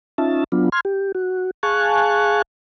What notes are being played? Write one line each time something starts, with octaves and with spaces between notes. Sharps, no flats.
C#4 D#4 F4 E5 A5
F#3 B3 D4 F4
C6 F6 G#6
G4
F#4
G#4 F5 G#5 A5 C#6 F#6